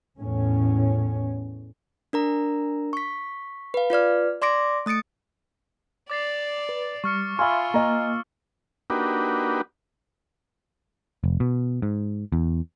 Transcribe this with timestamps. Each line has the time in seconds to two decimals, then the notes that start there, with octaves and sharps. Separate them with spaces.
0.19 E2 A2 C#4
2.13 D4 A#4 A#5
2.93 C#6 B6
3.74 B4 F5
3.90 F4 B4 D5 F6
4.42 D5 C6 D6 A#6 D7
4.86 A3 D#6 A6 C#7 D7
6.10 D5 D6 A6 C7
6.69 B4
7.04 G3 C#6 F6 C#7
7.39 F4 E5 F5 G#5 B5 C6 E6 F6
7.74 A#3 D#5 G#5 A#5
8.90 A#3 D4 D#4 F#4 G4 B4
11.24 F1
11.40 B2
11.82 G#2
12.32 E2